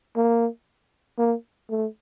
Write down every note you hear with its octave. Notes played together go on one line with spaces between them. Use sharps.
A#3
A#3
A3